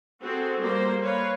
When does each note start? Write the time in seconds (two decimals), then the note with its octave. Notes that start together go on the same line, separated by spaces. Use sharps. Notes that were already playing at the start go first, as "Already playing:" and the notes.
0.22 C4 F#4 G#4 A4
0.59 G3 A#3 C5
1.02 B4 C#5 F5